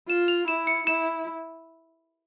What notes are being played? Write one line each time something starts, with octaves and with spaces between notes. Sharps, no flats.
F4 E7
F7
E4 E7
C#7
E4 E7